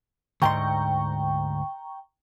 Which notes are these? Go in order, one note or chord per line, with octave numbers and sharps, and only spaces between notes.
D2 G#2 G5 A#5 C6 C#6